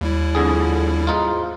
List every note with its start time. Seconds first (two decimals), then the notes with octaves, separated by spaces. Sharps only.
0.01 D#2 G3 E4
0.35 F2 D3 G#4
1.07 G#2 D#4 F4